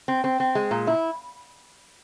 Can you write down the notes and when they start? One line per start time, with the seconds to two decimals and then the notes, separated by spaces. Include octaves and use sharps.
0.08 C4
0.24 C4
0.40 C4
0.55 G#3
0.71 A#2
0.87 E4